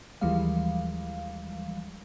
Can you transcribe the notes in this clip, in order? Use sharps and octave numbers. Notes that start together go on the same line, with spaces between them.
D#2 E3 F3 G3 G#3 F5